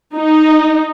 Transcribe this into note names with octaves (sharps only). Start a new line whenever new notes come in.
D#4